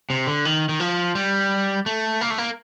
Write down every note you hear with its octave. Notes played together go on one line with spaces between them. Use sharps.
C3
D3
D#3
D#3
F3
G3
A3
A#3
A3
A#3